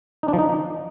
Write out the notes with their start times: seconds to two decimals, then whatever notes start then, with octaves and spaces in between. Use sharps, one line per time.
0.23 D#4
0.28 D4
0.33 F3
0.39 D#4